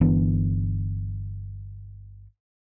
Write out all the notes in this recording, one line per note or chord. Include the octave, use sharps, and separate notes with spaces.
G1 E3 B3 D4